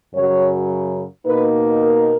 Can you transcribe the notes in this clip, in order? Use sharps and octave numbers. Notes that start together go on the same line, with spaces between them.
F#2 C#3 F#3 C#5
B2 A#3 D#4 B4
A#4